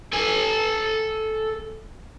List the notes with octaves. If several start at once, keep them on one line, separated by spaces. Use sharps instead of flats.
A4 G#5